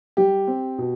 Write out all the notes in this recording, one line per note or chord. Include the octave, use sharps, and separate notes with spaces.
G3 G4
C4
B2